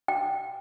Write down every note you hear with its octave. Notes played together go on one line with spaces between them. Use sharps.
G5